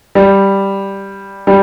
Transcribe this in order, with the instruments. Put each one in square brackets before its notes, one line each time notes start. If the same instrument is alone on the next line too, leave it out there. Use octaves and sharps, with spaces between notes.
[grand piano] G3
G3